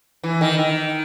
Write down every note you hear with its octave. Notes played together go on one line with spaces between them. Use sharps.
E3
D#3
D#3